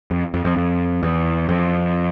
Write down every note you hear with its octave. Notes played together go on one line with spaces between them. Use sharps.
F2
F2
F2
F2
E2
F2